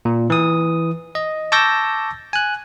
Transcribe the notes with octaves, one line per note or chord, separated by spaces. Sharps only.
A#2
E3 D#6
D#5
A5 C#6 D6 E6 G6 A#6
G#5 F#6